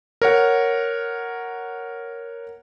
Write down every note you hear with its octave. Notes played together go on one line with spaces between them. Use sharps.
A#4 C#5 F#5